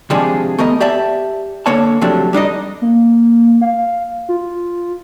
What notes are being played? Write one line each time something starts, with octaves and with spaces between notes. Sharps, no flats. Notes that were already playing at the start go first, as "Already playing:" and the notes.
C3 D#3 F3 G#3 D4 G#4
A3 B3 A#4 D#5
G4 D5 E5 A5
D3 A#3 C#5 A5
C3 F3 F#3 A3 D4
G3 D4 D#4 D#5
A#3
F5
F4